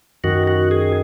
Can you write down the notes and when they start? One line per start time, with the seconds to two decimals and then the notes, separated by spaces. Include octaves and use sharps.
0.24 F#2 D#3 F#4
0.47 F#4
0.71 G#4